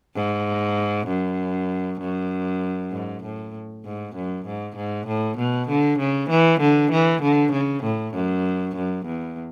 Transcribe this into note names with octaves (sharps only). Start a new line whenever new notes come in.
G#2
F#2
F#2
G#2
A2
G#2
F#2
G#2
G#2
A2
B2
D3
C#3
E3
D3
E3
D3
C#3
A2
F#2
F#2
E2